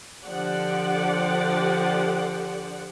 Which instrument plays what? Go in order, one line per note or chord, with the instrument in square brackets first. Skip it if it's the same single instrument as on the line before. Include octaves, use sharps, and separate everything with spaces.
[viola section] D3 F3 G4 D5 F#5